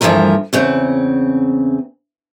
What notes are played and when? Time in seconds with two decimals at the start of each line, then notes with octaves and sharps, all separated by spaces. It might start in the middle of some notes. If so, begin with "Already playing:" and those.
0.01 D2 G2 E3 F3 A3 A#4
0.53 E2 C#3 C4